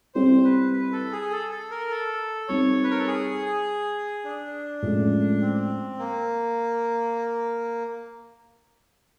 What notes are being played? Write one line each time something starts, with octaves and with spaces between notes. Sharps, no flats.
G3 C4 E4 C5
B4
B4
A4
G#4
A4
A4
A#4
A4
G3 C4 D#4 C#5
B4
A#4
A4
G#4
D4
A2 F3 G#3 C#4 F4
C4
A#3